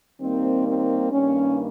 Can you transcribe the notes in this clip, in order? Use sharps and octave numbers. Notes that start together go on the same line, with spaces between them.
D#2 D#3 G3 A#3 C4
C4
G2 D#3 G3 A#3 C#4